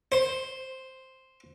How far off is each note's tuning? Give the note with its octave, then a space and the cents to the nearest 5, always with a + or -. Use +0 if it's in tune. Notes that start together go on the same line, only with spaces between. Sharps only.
C5 +0